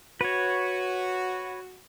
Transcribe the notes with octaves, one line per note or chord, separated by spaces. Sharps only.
F#4 B4 C#5